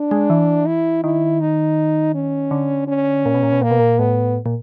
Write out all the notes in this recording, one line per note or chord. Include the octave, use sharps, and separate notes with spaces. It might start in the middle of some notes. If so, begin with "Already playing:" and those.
Already playing: D4
G#3
E3
E4
D#3 E4
D#4
C#4
D3
C#4
A#2
B2
A#2
B2
A#2 A#3
B2
A#2
A2 B3
A#2